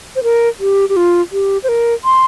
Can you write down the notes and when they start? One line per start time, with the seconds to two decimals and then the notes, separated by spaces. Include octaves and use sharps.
0.16 C5
0.23 A#4
0.60 G4
0.89 G4
0.96 F4
1.32 G4
1.64 C5
1.69 A#4
2.05 C6